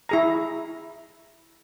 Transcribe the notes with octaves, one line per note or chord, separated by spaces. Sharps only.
E4 G#4 A#5